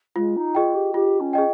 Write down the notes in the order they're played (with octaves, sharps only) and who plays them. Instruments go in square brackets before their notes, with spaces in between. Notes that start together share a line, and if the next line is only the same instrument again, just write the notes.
[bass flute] G#3 [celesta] F4
[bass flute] D#4
[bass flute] F4 [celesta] G#4 D#5 G5
[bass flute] G4
[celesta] F4 [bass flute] G4
[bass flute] C#4
[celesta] G#4 D#5 G5